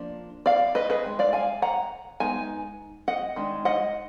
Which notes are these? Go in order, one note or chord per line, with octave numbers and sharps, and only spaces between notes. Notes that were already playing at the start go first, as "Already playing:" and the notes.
Already playing: F3 A#3 D4
D5 F5
B4 D#5
G#4 B4
D#3 G#3
D5 F5
F5 G#5
F#5 A#5
G#3 B3 D#4 G#5
D#5 F#5
D#3 G#3 D4
D#5 F#5